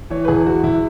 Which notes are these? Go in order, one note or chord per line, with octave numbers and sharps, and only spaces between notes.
E3 C#5
B4
E2 G#4
E3 F#4
E2 E4